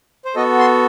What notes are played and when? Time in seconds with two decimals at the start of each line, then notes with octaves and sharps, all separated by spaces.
0.25 C5
0.35 B3 F#4 A4 D#5
0.59 C6